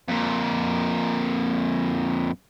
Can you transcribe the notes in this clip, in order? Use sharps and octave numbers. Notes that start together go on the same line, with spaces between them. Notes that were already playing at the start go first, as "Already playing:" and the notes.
F2 A#2